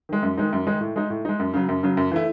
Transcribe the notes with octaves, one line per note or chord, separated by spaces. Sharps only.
D#3 G#3
F#2
D#3 G#3 D#4
F#2
D#3 G#3 D#4
A2
G#3 D#4
A2
G#3 D#4
F#2
C#3 F#3
F#2
C#3 F#3
F#2
E3 A3 E4